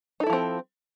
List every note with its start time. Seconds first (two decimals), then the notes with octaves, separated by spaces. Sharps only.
0.20 D#4
0.23 A4
0.26 E4
0.30 F3
0.33 C4